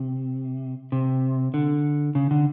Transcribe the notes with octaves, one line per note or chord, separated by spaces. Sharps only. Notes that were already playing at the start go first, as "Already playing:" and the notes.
Already playing: C3
C3
D3
C#3
D3